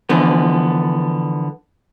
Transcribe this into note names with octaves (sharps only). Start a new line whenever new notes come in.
D3 E3 F3 B3